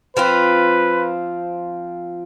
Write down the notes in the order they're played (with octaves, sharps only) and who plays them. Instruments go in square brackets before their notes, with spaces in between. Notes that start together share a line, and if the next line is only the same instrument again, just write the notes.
[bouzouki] F3 C4 F4 [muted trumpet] B4